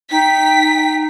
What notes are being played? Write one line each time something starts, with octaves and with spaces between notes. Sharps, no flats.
D#4 G5 B6